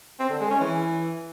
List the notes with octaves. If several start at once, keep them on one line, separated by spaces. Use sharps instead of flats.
C4
D3
G#3
C#4
E3